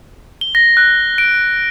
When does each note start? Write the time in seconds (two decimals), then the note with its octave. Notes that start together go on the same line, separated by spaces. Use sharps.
0.41 G7
0.55 A#6
0.77 F#6
1.18 D7